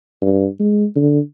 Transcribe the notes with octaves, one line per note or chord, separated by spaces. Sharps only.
G2
G#3
D3